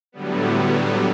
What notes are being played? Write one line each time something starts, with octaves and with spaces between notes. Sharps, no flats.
A2 D3 F#3 G3 B3